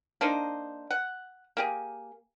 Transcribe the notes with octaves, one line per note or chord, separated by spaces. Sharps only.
A#3 D4 D#4 C5
F#5
A#3 G4 G#4